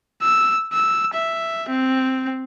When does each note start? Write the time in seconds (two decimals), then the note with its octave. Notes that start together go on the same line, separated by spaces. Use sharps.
0.22 E6
0.73 E6
1.14 E5
1.69 C4